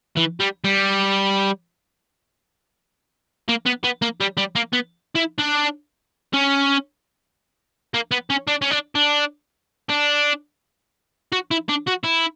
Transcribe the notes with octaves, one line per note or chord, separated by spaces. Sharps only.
E3
G3
G3
A#3
B3
B3
A#3
G3
G3
A#3
B3
E4
D4
C#4
A#3
B3
C#4
D4
C#4
D4
D4
D4
F#4
E4
D4
F#4
E4